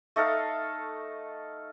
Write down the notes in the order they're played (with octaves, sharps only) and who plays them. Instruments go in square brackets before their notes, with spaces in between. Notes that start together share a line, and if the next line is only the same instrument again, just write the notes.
[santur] A3 D#4 A4 F5